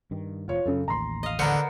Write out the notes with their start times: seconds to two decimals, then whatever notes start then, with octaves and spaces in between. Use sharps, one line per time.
0.11 G2 D#3
0.48 F1 F3 F4 C#5
0.66 F#2 C#3 A4
0.88 A1 D#2 A#5 C6
1.23 D#5 F5
1.39 D3 B3 A#4 C5 C#7